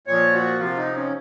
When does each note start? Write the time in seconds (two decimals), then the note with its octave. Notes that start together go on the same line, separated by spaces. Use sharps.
0.07 A#2 F3 C#5
0.34 F#4
0.59 C3 F3 F4
0.77 D#4
0.94 C#4